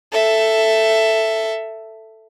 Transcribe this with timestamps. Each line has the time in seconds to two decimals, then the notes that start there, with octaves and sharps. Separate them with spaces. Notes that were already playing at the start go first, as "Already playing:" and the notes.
0.12 A4 E5